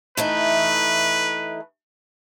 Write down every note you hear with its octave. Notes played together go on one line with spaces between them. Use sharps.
E3 A3 D#4 B4